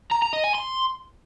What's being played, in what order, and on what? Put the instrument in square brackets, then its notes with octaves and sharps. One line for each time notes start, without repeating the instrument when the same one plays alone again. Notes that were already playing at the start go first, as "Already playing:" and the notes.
[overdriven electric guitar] A#5
A#5
D#5
G#5
C6